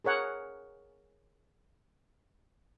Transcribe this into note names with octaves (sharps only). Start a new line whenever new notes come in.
G#4 A#4 C#5 F#5